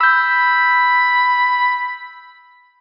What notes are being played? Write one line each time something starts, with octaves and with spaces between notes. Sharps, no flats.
B5 E6 G6